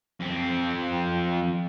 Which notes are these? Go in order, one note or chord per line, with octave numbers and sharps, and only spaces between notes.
F2 C4